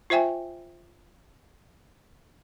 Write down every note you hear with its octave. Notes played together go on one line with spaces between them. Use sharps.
F4 C5 E5 G5 G#5